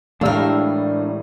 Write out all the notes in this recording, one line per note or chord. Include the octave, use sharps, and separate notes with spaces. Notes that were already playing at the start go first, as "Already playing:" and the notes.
A2 E3 G3 G#3 D4 A#4 F5 E6